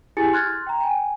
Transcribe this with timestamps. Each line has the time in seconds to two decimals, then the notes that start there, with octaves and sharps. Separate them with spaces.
0.17 E4 G4 G#4 G#5 A6 C#7
0.33 C6 F6 F#6 G#6 A6
0.67 G5 A#5
0.81 G5 G#5